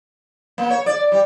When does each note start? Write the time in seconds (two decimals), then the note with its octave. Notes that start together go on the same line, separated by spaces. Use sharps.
0.58 A#3
0.70 C#5
0.86 D5
1.12 G3